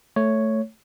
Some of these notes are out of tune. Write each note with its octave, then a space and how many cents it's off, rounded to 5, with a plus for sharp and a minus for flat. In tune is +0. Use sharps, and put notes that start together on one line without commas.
A3 +0 C#5 +0